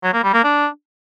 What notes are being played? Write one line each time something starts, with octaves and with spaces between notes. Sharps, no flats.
F#3
A#3
G3
A#3
D4